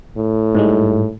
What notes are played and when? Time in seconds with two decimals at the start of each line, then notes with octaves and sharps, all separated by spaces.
0.18 A2
0.55 G#2 G3 G#3